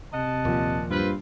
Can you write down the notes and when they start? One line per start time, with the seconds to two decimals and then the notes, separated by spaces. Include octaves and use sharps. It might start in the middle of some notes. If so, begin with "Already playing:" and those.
0.13 C3 D#5 F#5 A5
0.45 D#2 A#2 F3
0.90 G2 C4 F4 B4